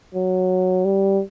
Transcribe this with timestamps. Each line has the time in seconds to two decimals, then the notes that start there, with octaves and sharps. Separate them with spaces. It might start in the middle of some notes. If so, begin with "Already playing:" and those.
0.15 F#3
0.85 G3